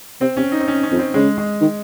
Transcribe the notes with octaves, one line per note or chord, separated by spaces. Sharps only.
C3 C4
C3 C#4
D#4
C4
C#4
C#4
F2
C4
C#3 G#3
G#3
D#3